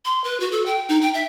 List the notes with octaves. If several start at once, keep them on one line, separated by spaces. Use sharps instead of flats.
C6
B4
F#4
A4
G5
D#4
G5
E5